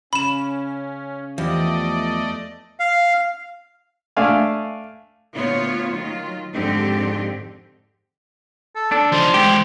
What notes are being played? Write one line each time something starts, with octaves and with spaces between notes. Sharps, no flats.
C#3 C#4 B5 E7
E2 F3 A3 E4 G4 D5 D#5
F5
A3 D4 F5 G#5 F6
D2 A#2 B3 F4 C5 C#5
D#3 F#3 F4
F2 G#2 D3 C4 G4
A4
D4 A4
F3 D#4 C5
G#2 E3 G4